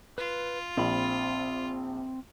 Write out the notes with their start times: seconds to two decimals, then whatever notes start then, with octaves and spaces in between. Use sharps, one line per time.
0.18 F4 B4
0.77 A#1 C4 B5